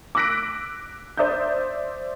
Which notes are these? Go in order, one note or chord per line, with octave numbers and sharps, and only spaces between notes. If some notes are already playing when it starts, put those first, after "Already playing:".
D6 E6 F#6 A#6 B6 D7
C5 D5 E5 D#6 G6